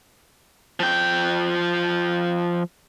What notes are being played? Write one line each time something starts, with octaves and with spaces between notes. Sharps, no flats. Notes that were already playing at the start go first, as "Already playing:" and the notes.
F3 G5